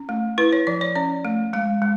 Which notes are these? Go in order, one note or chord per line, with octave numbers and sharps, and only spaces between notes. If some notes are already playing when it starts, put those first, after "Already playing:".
Already playing: C#4
A3
E4 B4
C#5
F3 D5
C#5
C#4 D5
A3
G#3 F5
G#3